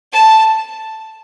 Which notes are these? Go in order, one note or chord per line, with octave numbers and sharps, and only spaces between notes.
A5